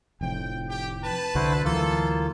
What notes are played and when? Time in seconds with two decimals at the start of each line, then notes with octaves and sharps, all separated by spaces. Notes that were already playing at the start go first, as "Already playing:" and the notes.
0.21 F1 F2 A2 G5
0.69 G4 G5
1.04 B4 A5
1.35 C2 D3 E4 F#4 C5
1.65 D2 E3 F#3 A#3 F4 A4